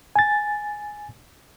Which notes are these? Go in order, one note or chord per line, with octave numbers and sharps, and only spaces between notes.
G#5 A6